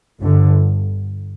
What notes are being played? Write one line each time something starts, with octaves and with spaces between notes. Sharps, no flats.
G1 G2 D3